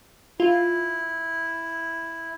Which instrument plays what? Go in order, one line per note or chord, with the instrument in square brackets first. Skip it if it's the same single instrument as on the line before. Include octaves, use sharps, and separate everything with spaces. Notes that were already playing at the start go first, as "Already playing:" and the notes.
[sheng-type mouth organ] E4 [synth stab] F4